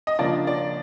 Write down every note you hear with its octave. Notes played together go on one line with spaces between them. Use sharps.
D#5
C#3 F3 A#3 D4 D5
D5